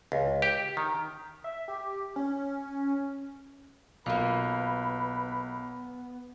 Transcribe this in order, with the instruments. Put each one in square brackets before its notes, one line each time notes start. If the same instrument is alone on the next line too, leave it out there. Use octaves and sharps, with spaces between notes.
[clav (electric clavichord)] C#2
G4
D#3
[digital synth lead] E5
G4
C#4
[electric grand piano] B1 [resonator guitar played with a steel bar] A#3 F4 [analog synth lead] B3 [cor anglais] B4